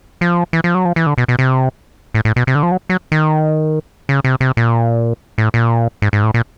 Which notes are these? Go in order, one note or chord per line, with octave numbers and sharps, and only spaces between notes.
F3
E3
F3
F#3
F3
E3
D3
B2
B2
C3
A2
A2
B2
C3
D3
F3
F#3
F#3
D#3
C#3
C3
C3
A#2
A2
A#2
G#2
G#2
A2
A#2